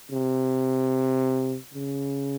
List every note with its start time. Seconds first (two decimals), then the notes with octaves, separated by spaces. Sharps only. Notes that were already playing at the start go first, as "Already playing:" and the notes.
0.12 C3
1.74 C#3